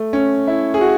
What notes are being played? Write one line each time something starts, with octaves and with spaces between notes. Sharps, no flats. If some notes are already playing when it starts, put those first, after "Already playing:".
Already playing: A3
C#4
E4
G#4
F#4